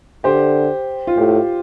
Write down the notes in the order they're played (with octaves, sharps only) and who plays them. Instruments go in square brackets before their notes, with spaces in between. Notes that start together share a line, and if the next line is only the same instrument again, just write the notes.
[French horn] D3 [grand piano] G4 C5
[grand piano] F4
[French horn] A2 [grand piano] G4